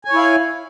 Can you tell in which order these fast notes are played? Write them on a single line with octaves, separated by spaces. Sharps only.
G#5 C#5 E4 F5